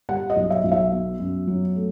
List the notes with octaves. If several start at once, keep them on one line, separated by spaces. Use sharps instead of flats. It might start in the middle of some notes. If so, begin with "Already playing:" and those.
G3 F#5
D#5
B1
E5
B1
E5
B3
F#2
F#3
A3